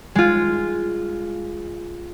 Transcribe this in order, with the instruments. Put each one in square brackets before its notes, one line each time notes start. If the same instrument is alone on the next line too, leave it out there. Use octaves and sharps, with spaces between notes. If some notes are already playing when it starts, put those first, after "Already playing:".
[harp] G#3 F4